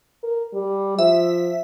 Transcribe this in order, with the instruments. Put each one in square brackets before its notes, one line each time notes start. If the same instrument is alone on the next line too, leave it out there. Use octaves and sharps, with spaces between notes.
[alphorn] A#4
G3
[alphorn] F3 [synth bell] E5